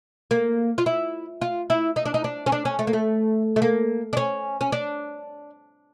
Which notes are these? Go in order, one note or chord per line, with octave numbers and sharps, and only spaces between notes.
A#3
F4
E4
F4
E4
D#4
D4
D#4
D4
C#4
D4
C#4
A3
A#3
A3
A3
A#3
D4
C#4
C#4
D4